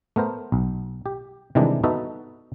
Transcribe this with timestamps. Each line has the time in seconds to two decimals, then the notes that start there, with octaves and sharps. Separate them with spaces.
0.16 A3 B3 A#4 C5
0.52 B1
1.06 G4
1.55 C3 D#3 E3 G3 G#3 D4
1.84 B3 D#4 F#4 A4 E5